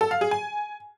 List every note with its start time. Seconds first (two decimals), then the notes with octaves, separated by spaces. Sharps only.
0.01 A4
0.11 F5
0.21 G#4
0.31 G#5